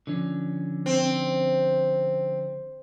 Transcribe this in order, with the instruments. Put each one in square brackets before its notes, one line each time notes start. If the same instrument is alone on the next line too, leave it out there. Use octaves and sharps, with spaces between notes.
[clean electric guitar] D3 F3 C#4
[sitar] C4